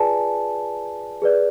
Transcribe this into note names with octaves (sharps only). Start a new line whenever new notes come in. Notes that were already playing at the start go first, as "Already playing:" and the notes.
Already playing: F4 G#4 B4 D5 G#5 A5
G#4 B4 D5